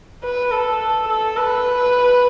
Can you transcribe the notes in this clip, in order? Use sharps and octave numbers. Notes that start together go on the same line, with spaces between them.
B4
A4
A4
B4